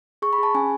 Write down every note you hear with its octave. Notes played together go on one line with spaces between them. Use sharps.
G#4 C#6
B5
G#4 A5
C#4 G#5